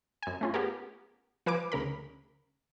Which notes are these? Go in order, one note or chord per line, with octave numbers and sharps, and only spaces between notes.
F#2 G#5
A3 C#4 F4
B3 G4 G#4 A#4
F3 B4 G#5 D6 D7
D2 C#3 A#4 B5